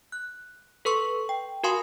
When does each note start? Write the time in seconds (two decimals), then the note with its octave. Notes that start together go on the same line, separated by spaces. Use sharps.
0.12 F#6
0.85 A4 B4 C6 C#6
1.29 G5
1.64 F#4 A#4 F5 G#5 C6 D#6